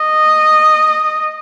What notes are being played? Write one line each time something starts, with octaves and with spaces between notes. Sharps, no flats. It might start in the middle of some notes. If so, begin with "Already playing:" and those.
Already playing: D#5